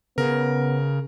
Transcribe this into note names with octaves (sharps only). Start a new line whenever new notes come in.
C#3 B3 A#4